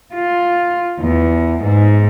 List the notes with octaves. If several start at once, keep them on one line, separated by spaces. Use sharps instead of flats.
F4
E2
G#2